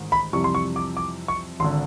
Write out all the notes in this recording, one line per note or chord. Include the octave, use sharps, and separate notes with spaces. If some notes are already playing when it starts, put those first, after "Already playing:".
Already playing: A1 G#2 D#3
B5
F2 C3 E3 G3 C#6
C6
C#6
D6
D6
C#6
G#1 D3 C6